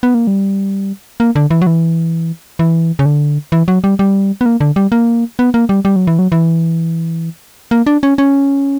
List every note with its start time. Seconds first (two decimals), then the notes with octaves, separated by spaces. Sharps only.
0.03 B3
0.14 A#3
0.27 G3
1.20 A#3
1.36 D3
1.51 E3
1.61 F#3
1.67 E3
2.59 E3
2.99 C#3
3.06 D3
3.52 E3
3.68 F#3
3.84 G3
3.99 G3
4.41 B3
4.46 A#3
4.61 D3
4.76 G3
4.92 A#3
5.39 B3
5.54 A#3
5.69 G3
5.85 G3
5.96 F#3
6.07 E3
6.19 F#3
6.32 E3
7.71 A#3
7.87 D4
8.03 C#4
8.18 C#4